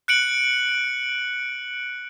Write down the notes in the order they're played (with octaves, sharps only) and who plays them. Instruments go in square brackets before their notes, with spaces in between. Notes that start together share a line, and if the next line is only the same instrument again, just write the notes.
[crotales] F#6 C#7 D7 F#7